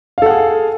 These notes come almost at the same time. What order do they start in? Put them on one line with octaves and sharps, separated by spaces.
F5 A4 F#5 G#4